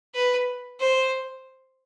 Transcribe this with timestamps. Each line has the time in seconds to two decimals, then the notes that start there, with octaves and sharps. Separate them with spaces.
0.15 B4
0.80 C5